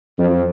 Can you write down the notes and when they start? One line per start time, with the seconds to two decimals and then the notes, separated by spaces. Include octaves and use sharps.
0.19 F2